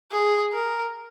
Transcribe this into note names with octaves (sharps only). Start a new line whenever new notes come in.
G#4
A#4